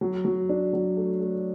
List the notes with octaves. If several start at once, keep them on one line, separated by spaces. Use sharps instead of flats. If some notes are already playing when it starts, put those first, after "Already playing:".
F#3
F#3
D4
F#3
A3
A3